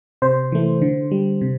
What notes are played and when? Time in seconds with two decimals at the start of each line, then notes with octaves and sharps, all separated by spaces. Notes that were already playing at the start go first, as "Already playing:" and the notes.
0.22 C3 C5
0.52 E3 A3
0.82 D3
1.11 G3
1.41 C3